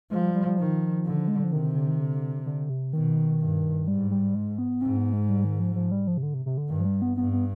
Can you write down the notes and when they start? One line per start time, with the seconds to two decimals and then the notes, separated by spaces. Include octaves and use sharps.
0.11 F3 G#3
0.23 G3
0.35 G3
0.47 G3
0.58 D#3 F3
1.05 D3
1.28 G#3
1.36 G3
1.43 F3
1.52 C3 D#3
1.76 D3
1.88 D#3
1.99 D3
2.46 D3
2.70 C3
2.93 B2 D#3
3.40 G2
3.87 G#2 G3
4.11 G3
4.35 G#3
4.58 B3
4.81 G#2 C4
4.97 B3
5.13 G#3
5.29 G3
5.44 D#3
5.60 F3
5.75 F3
5.91 G3
6.07 F3
6.17 C3
6.23 D3
6.34 C3
6.46 C3
6.58 D3
6.69 G2 D#3
6.80 F3
6.85 G3
7.02 B3
7.17 G2 B3
7.33 B3